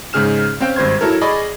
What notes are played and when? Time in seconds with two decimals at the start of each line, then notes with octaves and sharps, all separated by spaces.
0.13 G#2 C#3 G#4 F6 E7
0.60 C4 C#4 F5 G5
0.76 G#1 G2 C5 C6 G#6
1.01 F#3 E4 A4 A#4
1.21 G#4 D5 D#5 B5 C#6